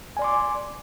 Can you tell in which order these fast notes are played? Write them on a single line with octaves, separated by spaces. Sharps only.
G#5 D5 C6 D6